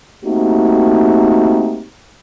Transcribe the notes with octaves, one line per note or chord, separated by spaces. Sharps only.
A3 A#3 C4 D#4 F#4 G4